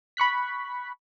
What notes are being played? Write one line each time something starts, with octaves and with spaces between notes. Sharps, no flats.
B5 C#6 F#6 B6